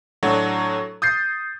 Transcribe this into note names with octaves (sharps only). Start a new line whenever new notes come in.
A2 F#3 D4 F#4 A4
D#6 G6 A6 C7